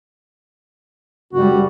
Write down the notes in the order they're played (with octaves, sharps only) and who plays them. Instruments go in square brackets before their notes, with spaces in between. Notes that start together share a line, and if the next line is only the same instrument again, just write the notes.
[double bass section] F#1 G3 [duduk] F#4